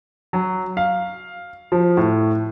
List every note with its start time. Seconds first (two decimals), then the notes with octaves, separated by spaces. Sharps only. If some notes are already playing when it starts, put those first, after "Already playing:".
0.33 F#3
0.77 F5
1.72 F3
1.97 A2